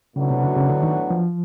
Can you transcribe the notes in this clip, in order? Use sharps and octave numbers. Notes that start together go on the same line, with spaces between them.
A2 C#3 F#3 B3 D4 F#4
C3
C#3
C#3
D3
D#3
F3